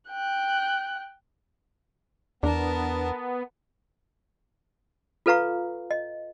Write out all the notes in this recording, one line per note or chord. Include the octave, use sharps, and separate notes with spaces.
G5 F#6
E2 B3 D4 A#4 A5
F4 A4 B4 F5 A#5 C#6
D#5